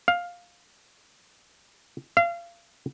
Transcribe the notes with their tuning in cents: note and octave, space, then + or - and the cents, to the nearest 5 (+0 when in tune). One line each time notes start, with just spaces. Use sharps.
F5 +10
F5 -30